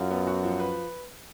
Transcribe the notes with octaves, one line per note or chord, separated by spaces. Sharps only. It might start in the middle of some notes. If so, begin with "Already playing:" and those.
Already playing: F#2 F4
B3
F#4
F3
B4